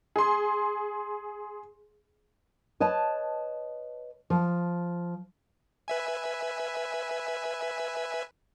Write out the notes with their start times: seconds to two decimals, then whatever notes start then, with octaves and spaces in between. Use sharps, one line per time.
0.16 G#4 C6
2.80 B4 C#5 D#5 A5
4.30 F3
5.88 B4 E5 G#5